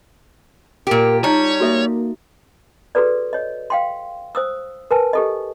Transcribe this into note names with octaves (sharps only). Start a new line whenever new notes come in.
A#2 G4 A#4
G3 D#4 F4 C#5 A5 A#5
A#3 F#4 A4 E5
F#4 G#4 A4 B4 D5
C#5 D#5
F5 G5 C6
C5 D#6 E6
A#4 B4 G#5 A5
G4 A4 D#5